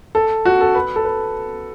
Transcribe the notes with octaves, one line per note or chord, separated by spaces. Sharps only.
A4
F#4
A4
B4
A4
B4